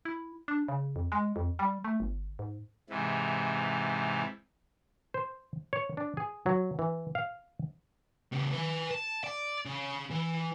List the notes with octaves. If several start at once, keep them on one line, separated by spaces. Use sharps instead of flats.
E4
D4
C#3
F2
G#3
F2
G3
A3
G1
G#2
G#2 C3 E3
C5
C#5
D4
G#4
F#3
E3
F5
C#3 G3
B4 G#5
A5
D5
C#3
E3